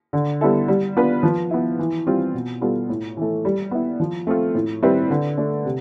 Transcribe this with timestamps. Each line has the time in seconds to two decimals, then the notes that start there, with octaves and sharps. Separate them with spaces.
0.13 D3
0.41 G3 B3 E4 A4
0.68 G3
0.97 B3 D4 F4 B4
1.23 F3
1.51 B3 E4
1.79 E3
2.07 G3 C4 F4
2.34 B2
2.61 G3 B3 F4 A4
2.89 A2
3.17 E3 A3
3.45 G3
3.71 B3 E4
4.00 F3
4.27 A3 C4 F4
4.55 A2
4.83 G3 C4 E4 B4
5.10 D3
5.38 A3 D4
5.65 C3